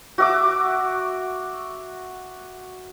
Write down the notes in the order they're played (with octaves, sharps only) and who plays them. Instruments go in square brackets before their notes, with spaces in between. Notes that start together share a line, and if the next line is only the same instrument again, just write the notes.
[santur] F#4 E5 D6